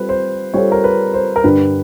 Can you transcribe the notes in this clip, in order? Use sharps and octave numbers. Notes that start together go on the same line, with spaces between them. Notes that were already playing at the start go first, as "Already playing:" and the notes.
Already playing: G3 C4 F4 A4 B4
C5
G3 C4 F4 A4 C#5
A#4
B4
C5
A#4
G2 D3 G3 B4